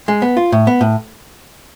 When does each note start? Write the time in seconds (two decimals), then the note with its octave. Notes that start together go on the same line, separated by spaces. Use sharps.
0.08 G#3
0.22 B3
0.37 F4
0.52 A2
0.67 B3
0.81 A2